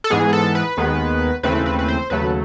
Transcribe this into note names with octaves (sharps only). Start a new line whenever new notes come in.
A4
G#2 E3 G#3 B3 G#4
A4
B4
D#2 D#3 G#3 B3
D#2 C#3 E3 A3 C4 B4
B4
B4
C5
D#2 C#3 F#3 A3 B4